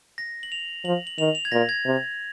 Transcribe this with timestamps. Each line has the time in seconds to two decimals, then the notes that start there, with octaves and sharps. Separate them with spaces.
0.18 A#6
0.43 F#7
0.52 F7
0.85 F3 F#7
1.07 F#7
1.18 D#3 F7
1.35 F7
1.45 G#6
1.52 A#2 A#6
1.69 G#6
1.86 C3